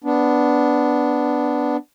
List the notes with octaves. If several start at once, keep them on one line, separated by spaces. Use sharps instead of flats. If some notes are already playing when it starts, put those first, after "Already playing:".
B3 D4